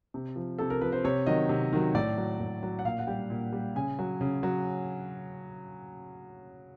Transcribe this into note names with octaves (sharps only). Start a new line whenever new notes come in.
C3
F3
C3 A4
A#4
F3 B4
C5
C3 C#5
D#3 F#3 D#5
C3
D#3 F#3
A2 D5
F#3
A2
F#3
F#5
A#2 F5
F#5
G3 G5
A#2
G3
C#3 G#5
F#3
C#3
F#3